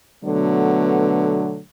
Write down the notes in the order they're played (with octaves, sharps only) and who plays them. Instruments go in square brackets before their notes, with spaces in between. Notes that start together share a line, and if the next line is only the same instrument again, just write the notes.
[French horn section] B2 D3 F#3 A3 B3